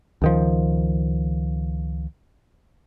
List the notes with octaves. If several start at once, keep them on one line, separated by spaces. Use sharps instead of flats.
C#2 D#3 F3